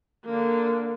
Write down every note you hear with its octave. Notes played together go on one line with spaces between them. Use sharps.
D3 A#3